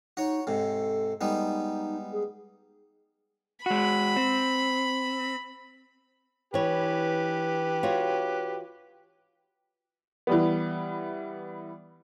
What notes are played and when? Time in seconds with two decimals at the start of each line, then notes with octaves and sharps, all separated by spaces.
0.17 D#4 F#4 C#5
0.47 G#2 C3 A4
1.21 G3 G#3 B3 D#4
2.12 G#4
3.66 G#3 F#4 B5
4.16 C4
6.54 E3 G4 B4 C#5
7.83 F4 F#4 C#5
10.27 E3 G3 B3